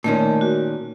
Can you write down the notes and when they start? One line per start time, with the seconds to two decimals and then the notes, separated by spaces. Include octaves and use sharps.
0.04 A#2 D#3 A3 C#4 A#4
0.41 F#4